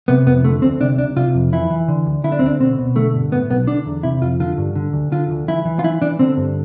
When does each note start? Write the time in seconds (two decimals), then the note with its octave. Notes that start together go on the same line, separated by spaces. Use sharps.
0.08 C3 B3
0.26 F2 B3
0.44 D3 A3
0.62 D2 C4
0.80 C3 D4
0.98 C2 D4
1.16 C3 F4
1.34 F2
1.52 E3 E4
1.70 E3
1.88 D3
2.06 D2
2.24 D3 E4
2.32 D4
2.39 C4
2.43 D2 D4
2.60 B2 C4
2.79 B2
2.96 D3 A3
3.14 G2
3.32 A2 B3
3.50 B1 B3
3.67 D3 D4
3.86 E2
4.03 C3 E4
4.22 F2 F4
4.40 D3 F4
4.58 G2
4.76 D3
4.93 D2
5.12 D3 F4
5.30 D2
5.48 E3 E4
5.65 E3
5.79 F4
5.84 E3 E4
6.02 E3 D4
6.19 D3 C4
6.37 G2